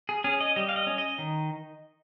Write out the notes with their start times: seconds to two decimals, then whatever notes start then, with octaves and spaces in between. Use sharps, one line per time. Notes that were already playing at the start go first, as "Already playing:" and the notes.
0.09 G#4
0.24 C#4 G#4
0.41 D#5
0.56 G3 D#5
0.69 F5
0.76 D#5
0.87 C#4
0.98 D#5
1.18 D#3